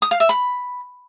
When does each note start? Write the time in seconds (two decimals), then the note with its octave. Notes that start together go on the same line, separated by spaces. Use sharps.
0.02 D#6
0.11 F5
0.20 E5
0.29 B5